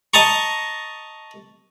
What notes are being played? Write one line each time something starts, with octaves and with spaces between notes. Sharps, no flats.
D#5 A5 A#5 C#6